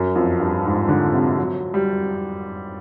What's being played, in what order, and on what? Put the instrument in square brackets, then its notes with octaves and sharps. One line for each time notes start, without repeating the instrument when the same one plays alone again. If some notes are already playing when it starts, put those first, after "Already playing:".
Already playing: [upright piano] F#2
F2
G2
G#2
D3
C3
F#3
G3